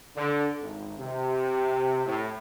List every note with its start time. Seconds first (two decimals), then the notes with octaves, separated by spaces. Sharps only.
0.16 D3
0.60 G#1
0.98 C3
2.06 A2